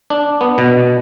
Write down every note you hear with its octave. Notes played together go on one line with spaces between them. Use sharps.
D4
B3
B2